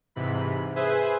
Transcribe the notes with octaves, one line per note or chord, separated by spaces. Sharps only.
G#2 C3 E3 B5
G#4 B4 C5 E5 G#5